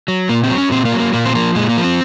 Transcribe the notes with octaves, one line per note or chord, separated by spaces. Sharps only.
F#3
A#2 A#3
C4
F#3
C#4
A#2 C4
A#3
F#3
A#3
A#2 A#3
C4
F3 A#3
A#2 G#3
A#3
F3
C4